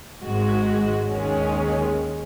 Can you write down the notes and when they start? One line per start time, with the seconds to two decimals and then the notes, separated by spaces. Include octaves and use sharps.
0.21 G#1 G#2 G#3 F#4
1.10 D#2 D#3 G#3 C#4